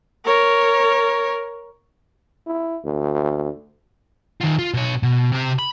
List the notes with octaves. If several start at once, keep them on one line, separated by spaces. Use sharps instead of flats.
A#4 C#5
E4
D2
D#3 F4
F4
B2 C#5
B2
C3 G4
B5